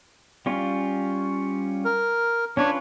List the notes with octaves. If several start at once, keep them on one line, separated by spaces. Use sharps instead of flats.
G3 C#4 F4
A#4
C#4 D4 F4 B4 C#5